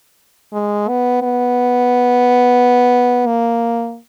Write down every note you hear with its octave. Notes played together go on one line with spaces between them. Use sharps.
G#3
B3
B3
A#3